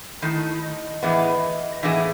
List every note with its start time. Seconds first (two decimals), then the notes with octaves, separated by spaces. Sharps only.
0.22 D#3 A3 D#4 E4
0.63 D#5
1.03 A2 E3 B3 E4 G#4
1.83 A2 E3 B3 E4 G#4 E5